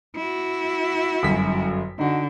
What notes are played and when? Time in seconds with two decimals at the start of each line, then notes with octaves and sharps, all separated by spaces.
0.16 E4 F#4
1.23 G1 F#2 B6
1.99 D3 D#4 F#4